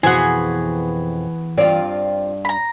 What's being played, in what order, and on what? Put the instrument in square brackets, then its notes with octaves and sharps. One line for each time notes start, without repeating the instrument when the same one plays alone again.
[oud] F2 B2 C5 [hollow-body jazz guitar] E3 F#4 [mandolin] B3 G#4
[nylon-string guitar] G2 D5 [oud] C4 F4
[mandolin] A#5 B5